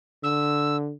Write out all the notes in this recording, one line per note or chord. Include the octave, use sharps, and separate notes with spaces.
D3 E6